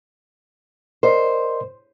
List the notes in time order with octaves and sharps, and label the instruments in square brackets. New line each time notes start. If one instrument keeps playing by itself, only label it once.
[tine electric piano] A#4 D5 D#5 [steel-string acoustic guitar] C5